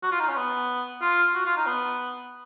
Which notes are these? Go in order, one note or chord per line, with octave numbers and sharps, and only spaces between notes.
F#4
F4
D#4
C#4
B3
F4
F#4
F4
D#4
B3